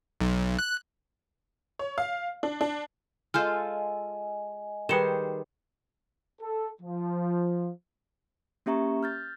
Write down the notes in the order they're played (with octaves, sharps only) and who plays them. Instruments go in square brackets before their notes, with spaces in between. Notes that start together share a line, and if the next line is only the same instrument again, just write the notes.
[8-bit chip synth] B1
F#6
[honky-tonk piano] C#5
F5
D4
D4
[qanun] G#3 F4 A4 [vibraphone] D#5 G#5 [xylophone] F6 G6
[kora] D#3 G3 G#4 [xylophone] B4 C#7 E7 [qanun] C5
[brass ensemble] A4
F3
[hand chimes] A#3 C#4 G4 E5 A#5 C#6
F6 G6 A6